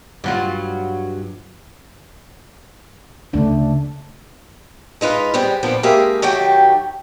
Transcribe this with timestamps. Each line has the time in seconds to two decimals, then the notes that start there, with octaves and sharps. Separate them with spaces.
0.24 G2 F#3 F4
3.33 D2 C#3 A3 D4
5.01 G#3 D#4 F4 B4
5.34 G3 G#3 B3 C4
5.63 A#2 F3 B3 C4 D4
5.83 G#3 A#3 G4 G#4 E5 F5
6.22 D#3 F#3 A3 G4 G5